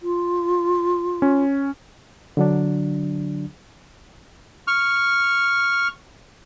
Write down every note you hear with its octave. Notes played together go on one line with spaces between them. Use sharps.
F4
C#4
D3 F#3 D4
C#6 F6